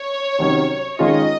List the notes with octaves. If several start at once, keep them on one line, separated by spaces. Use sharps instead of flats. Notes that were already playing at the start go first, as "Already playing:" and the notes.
Already playing: C#5
C3 D#3 F#3 C#4
D#3 G#3 C#4 F4 D#5